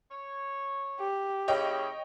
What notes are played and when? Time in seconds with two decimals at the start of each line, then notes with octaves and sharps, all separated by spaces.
0.10 C#5
1.00 G4
1.48 C#3 A#3 E4 C#5 D#5 G5